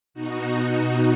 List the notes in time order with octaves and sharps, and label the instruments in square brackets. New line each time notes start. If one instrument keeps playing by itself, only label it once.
[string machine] B2 D#4 F#4